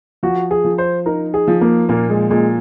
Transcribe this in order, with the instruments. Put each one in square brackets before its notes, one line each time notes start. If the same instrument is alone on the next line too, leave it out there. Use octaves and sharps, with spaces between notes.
[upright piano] F3 [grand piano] F#4
[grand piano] G#4
[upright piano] F3
[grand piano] C5
[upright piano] D#4 [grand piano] A#4
[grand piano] G#4
[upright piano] F3
[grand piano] A#3
[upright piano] A#2 [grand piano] A#3
[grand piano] G#3
[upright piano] A#2 [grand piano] G#3